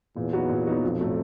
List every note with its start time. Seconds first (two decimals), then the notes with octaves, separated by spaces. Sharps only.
0.16 E2 A#2
0.33 F#3 B3 D#4 F#4
0.49 A#2
0.66 F#3 B3 D#4 F#4
0.84 B1 F2
0.99 A2 F#3 A3 C4